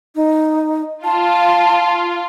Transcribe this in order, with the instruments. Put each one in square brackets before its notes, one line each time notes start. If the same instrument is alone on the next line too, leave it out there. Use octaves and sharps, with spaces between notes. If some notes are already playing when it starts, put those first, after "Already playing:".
[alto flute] D#4
[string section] F4 [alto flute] A5